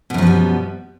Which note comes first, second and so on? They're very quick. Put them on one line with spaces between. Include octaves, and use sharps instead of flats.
B2 F#2 F3 B3 G3